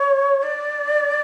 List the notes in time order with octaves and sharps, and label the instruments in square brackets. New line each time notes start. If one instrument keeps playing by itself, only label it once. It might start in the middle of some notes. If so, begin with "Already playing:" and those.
Already playing: [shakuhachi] C#5
D5